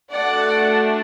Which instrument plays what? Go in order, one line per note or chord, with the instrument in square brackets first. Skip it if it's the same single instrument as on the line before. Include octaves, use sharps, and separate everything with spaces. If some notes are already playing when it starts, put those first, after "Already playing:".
[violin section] A3 D4 F#4 A4 D5 F#5